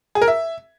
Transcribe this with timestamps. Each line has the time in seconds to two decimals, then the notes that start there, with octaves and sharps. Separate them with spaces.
0.15 G#4
0.21 A#4
0.28 E5